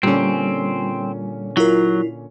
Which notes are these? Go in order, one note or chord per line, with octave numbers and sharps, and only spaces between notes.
A#2 D3 G3 C4 C#4
F#3 E4 F4 A#4